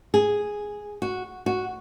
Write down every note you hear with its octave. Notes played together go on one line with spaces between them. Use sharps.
G#4
F#4
F#4